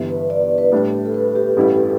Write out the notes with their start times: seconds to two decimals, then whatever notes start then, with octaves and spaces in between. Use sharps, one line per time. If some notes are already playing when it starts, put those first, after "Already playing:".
Already playing: G1 G2 E3
0.10 B4
0.30 D5
0.58 B4
0.72 A2 G3 D4
1.06 A4
1.14 B4
1.35 G4
1.57 A1 G2 G3 E4